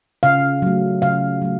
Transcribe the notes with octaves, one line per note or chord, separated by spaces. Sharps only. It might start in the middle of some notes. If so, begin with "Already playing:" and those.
C#3 F5
F#3 A3
C#3 F5
F#3 A3